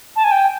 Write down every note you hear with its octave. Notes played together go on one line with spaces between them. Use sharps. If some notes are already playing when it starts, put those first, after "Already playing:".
A5
G#5
G5